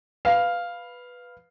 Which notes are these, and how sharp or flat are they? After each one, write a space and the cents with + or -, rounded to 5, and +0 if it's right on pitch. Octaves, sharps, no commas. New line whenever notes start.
B4 +0 F5 +0